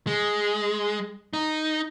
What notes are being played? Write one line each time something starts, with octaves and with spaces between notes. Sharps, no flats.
G#3
D#4